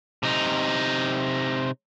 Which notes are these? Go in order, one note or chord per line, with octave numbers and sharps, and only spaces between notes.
C3 D#4